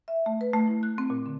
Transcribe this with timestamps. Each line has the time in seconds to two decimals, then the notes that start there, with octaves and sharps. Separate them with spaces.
0.08 E5
0.26 A3
0.41 B4
0.53 A3
0.67 E4
0.83 F#6
0.98 C4
1.10 A#2
1.26 D3